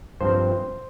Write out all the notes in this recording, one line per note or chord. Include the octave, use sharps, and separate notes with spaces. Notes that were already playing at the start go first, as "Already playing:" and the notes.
G2 F3 C4 C5